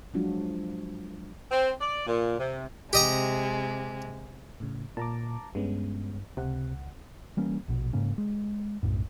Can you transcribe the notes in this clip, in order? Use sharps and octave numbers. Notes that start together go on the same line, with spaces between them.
F3 F#3 G#3 D4 F4 F#4
C4
D5
A#2
C3
C3 G#3 G4 D#5 A#5
A2 C#3
A#2 A5 A#5 D6
G2 G#3 B3 C#4
C#2 C3 F#5
E3 G3 A#3 C#4
A#1 B2
G#2 C#3 A#3 C#4
G#3
B1 F#2 A2